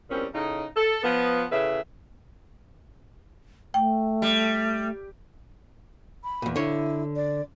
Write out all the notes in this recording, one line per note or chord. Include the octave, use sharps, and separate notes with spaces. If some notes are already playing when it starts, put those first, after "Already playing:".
E2 A#2 G3 C4 C#4
A2 C#3 D#4
A4
F3 B3
A2 C#3 G#4 B4 E5
A3 G5
G3
B5
E2 A#2
D3 E4 C#5
D5